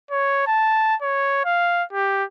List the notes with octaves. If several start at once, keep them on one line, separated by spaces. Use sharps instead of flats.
C#5
A5
C#5
F5
G4